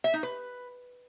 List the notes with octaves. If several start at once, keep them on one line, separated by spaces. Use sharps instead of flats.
E5
D#4
B4